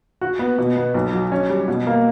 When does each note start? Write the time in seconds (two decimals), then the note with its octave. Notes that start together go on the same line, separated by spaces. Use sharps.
0.21 F#4
0.39 B3
0.58 B2
0.77 B3
0.95 B1
1.13 F#3
1.32 C#4
1.50 G3
1.68 B2
1.87 A#3